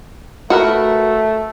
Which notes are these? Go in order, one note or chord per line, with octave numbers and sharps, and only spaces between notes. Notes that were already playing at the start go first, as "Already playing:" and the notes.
A3 F#4 A#4 B4